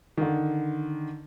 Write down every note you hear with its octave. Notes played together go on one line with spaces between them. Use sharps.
D3 D#3